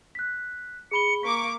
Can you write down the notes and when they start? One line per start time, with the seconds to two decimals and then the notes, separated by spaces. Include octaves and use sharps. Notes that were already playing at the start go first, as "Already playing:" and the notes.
0.15 F#6 B6
0.91 G#4 B5 C#7 G7
1.23 A#3 C#6 D6 B6